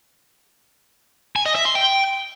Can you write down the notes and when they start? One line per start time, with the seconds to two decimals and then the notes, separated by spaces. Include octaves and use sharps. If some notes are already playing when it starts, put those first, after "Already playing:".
1.36 G#5
1.46 D#5
1.56 E5
1.65 C6
1.75 G5